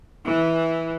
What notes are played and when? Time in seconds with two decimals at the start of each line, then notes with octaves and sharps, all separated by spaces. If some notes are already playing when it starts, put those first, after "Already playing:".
0.25 E3